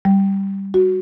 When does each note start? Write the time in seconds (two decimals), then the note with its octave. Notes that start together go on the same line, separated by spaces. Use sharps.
0.05 G3
0.74 F#4